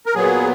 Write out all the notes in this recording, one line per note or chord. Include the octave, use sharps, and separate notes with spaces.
A#4
A#2 F#3 B3 G#4